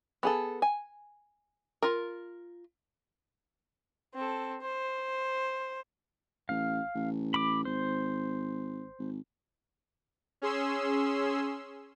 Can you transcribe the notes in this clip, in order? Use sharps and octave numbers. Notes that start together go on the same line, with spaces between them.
B3 G#4 A4
G#5
F4 A#4
C4 A4
C5
A1 F5
A1
B5 D6
G#1 C5
G#1
C#4 G#4 C6 E6